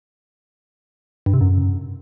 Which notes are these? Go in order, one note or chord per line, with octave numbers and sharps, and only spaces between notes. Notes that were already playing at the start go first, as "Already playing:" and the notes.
G2
C3
F#2